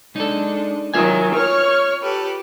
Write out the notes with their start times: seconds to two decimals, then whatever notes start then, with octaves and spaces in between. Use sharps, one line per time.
0.16 G#3 D4 D#4 A4
0.94 D#3 F#3 F4 E5 G#5
1.34 C#5 F6
2.01 G4 A4 B4